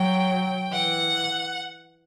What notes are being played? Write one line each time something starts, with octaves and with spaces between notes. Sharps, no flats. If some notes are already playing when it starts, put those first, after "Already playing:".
Already playing: F#3 G5
E3 F#5